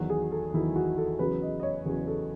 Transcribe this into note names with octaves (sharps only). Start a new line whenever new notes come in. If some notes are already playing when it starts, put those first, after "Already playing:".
Already playing: E2 D#3 F#3 F#4
G#4
A4
E2 D#3 F#3 E4
F#4
A4
E2 C#3 F#3 B4
D#5
D#5
C#5
E2 C#3 F#3
A4